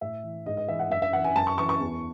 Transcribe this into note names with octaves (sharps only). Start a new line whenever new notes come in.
A2 E5
E3
G#2 D#5
D#5
E3 E5
F#5
F#2 E5
E5
E3 F#5
G#5
F#2 A5
C#6
E3 C#6
C#6
E2